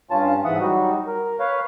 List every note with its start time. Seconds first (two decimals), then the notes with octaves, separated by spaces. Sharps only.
0.11 G2 C#4 F4 A5
0.45 G#2 E3 E5 F#5 D#6
0.60 F#3 G3 D#4 F#4
1.07 A#4
1.39 B4 C#5 F5